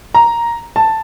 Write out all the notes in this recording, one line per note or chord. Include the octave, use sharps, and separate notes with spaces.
A#5
A5